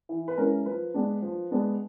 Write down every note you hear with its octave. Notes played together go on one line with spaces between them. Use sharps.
E3
B4
G#3 C#4 E4 A#4
F3 B4
G#3 B3 D4
F3
G#3 B3 D4